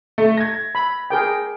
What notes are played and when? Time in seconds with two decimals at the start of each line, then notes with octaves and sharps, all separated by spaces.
0.18 A3
0.37 G#6 A#6
0.75 B5
1.10 G#4 A#4 G5